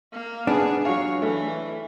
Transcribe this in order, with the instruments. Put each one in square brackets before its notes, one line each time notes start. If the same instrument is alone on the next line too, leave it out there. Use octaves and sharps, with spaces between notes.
[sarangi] A#3
[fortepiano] B3 [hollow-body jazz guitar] D4 [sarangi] G#4
[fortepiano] F#3 F5 [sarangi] C#5
[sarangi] E3 [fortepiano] A3